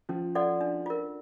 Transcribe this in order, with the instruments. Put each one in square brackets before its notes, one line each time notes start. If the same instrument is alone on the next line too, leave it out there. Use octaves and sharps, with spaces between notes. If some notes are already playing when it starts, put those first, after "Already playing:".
[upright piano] F3 [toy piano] C#4
[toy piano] F#4 A4 D5 F#5
D4
F4 A#4